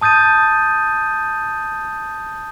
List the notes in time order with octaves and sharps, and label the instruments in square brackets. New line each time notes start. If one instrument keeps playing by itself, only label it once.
[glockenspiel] A5 D#6 G6 A6 D#7